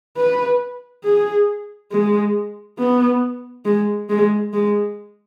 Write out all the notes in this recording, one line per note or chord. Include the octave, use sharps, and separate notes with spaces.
B4
G#4
G#3
B3
G#3
G#3
G#3